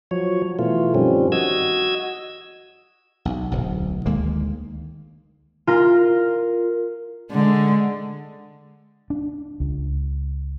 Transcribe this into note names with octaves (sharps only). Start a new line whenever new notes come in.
F3 F#3 C#5
B2 E3 A3 F4
G2 D#3 F3 G3 C4 C#4
F#4 D#5 E6 G#6
B1
D1 B1
D2 D#3 G#3 A#3
F4 A#4
D3 G#3
D4
C#2